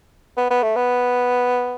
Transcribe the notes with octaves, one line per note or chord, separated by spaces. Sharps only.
B3
B3
A3
B3